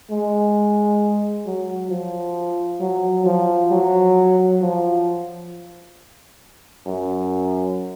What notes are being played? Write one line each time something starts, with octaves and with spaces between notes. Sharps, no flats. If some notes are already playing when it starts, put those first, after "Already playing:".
G#3
F#3
F3
F#3
F3
F#3
F3
F#2